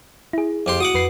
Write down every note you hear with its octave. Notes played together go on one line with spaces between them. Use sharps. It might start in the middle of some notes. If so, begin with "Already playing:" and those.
E4 G#4
F2 G4 C6
F#4 F#5 D6 D#6
F2 B4 C7